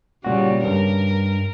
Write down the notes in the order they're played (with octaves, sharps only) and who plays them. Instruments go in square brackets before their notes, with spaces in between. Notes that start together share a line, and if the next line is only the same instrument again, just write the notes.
[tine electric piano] A#2 F#4 [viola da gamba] C#3 G3
[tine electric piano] G2 [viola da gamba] A#4